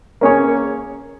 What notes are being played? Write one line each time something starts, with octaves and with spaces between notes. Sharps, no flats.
A#3 C#4 G#4 C#5